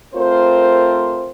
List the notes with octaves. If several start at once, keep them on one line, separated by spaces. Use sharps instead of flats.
A3 C4 F4 A#4 C5